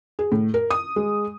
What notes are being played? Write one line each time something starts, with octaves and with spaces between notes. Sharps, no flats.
G#4
A2
A#4
D#6
G#3